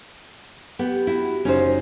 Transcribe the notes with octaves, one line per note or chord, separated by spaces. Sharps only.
B3 G4
E4 F#4
F#1 C#4 D#4 C5